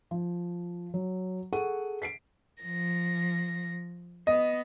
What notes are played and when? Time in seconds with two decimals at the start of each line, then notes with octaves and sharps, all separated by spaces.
0.11 F3
0.94 F#3
1.52 G#4 A4 F#5 C#6 D#7
2.02 B6 C7 D7
2.60 F3 A#6
4.27 B3 D#5